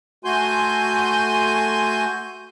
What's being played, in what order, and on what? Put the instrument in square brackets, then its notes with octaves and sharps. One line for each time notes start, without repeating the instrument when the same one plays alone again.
[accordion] A3 F#4 G#5 C6 G6